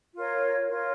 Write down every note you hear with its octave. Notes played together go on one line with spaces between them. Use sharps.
F4 A#4 C#5
F4 A#4 C#5